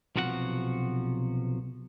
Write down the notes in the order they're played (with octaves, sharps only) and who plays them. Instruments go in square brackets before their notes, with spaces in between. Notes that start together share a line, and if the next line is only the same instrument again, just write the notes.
[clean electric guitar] B1 C3 F3 F#4 A#4 F#5